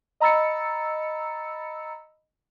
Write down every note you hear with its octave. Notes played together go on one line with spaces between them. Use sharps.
D#5 A#5 B5 E6 A6 C#7